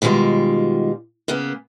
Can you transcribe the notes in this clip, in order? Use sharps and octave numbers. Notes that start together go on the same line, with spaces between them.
B2 D#3 G3 G#3 F4
C#3 A#3 B3